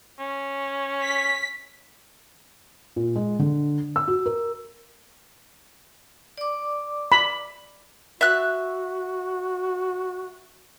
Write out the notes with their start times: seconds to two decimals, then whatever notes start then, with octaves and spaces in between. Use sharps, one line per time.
0.19 C#4
1.03 B6
2.96 A#2
3.16 G#3
3.39 D3
3.96 E6
4.08 F#4
4.26 A#4
6.38 D5 D6
7.12 B5
8.21 F#4 E5 F#6